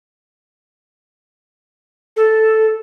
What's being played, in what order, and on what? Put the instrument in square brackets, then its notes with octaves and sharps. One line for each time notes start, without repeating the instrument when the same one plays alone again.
[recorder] A4